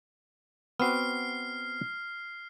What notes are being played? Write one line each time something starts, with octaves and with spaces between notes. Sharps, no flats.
B3 C4 F#4 F6 C7